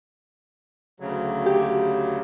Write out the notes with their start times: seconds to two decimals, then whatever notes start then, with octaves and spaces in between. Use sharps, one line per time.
1.00 D2 C#3 F#3
1.46 G4